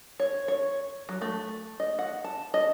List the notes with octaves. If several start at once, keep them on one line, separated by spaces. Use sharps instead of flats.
C#5
C#5
F#3
A3
D#5
F#5
A5
D#5